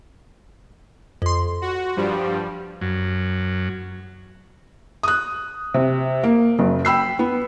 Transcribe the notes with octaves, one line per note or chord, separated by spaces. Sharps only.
F2 C6
F#4
G2 F3 G3
F#2
D#6 F#6
C3
A#3
F#1 F#3
G5 B5 E6 C7
B3